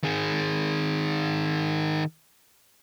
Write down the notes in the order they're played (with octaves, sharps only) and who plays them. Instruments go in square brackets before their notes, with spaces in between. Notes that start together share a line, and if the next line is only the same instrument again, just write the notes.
[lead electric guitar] D#3 G#4